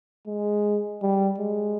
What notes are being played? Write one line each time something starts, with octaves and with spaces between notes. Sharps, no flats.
G#3
G3
G#3